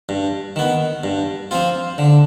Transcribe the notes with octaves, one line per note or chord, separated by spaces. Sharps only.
G2
D#3 B3
G2
F3 C4 F4
D3